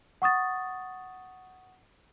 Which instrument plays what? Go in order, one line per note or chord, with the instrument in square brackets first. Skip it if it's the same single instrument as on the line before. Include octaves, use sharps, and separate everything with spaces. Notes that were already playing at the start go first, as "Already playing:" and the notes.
[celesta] F#5 C#6 D#6 A6